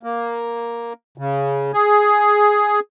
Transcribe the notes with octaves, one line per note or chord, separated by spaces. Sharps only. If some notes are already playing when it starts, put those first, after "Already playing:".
A#3
C#3
G#4